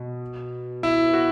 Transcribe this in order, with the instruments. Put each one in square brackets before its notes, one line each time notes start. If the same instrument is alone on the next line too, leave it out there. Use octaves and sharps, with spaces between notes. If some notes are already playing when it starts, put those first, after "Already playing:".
Already playing: [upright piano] B2
[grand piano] E4
F#4